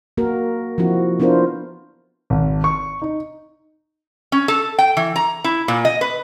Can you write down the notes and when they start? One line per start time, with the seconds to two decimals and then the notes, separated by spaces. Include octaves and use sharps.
0.18 A#3 F#4 A#4
0.78 F3 C4 E4 F#4
1.20 B3 D4 E4 F4 A#4 C5
2.30 G#1
2.64 C#6
3.02 D#4
4.32 C#4
4.48 A4
4.78 G5
4.97 E3
5.16 A#5
5.44 E4
5.68 A#2
5.85 D#5
6.01 B4